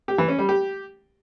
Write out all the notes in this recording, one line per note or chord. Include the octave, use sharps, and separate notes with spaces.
G4
E3
C#4
G3
G4